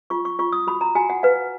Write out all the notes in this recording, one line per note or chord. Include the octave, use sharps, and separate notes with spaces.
F4 C#6
C#6
F4 C#6
D#6
F#4 B5
A#5
F#4 G#5
F#5
B4 F5